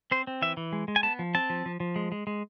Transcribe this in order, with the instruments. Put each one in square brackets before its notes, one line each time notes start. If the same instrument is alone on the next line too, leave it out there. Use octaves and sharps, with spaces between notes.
[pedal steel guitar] C4 C5
C4
E3 E5
E3
G#3
G#3
G#5
B3 A5
F3
C4 A5
F3
F3
F3
G#3
G#3
G#3